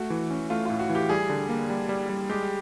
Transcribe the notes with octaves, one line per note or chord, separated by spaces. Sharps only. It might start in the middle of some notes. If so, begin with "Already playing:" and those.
Already playing: A3 F#4
E3
C#4
A3 F4
A2 F4
F#4
E3
G4
G3 G#4
D3
A#3
G3
G3
G3
G#3 G4